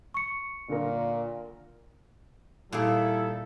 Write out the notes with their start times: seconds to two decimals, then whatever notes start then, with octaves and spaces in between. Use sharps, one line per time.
0.14 C#6 C#7
0.70 A#2 D3 A#4
2.72 A#2 D#3 G3 E4 G#4 A4